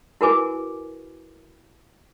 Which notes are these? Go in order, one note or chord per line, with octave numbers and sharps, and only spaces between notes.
E4 F#4 A#4 B4 G#5 D6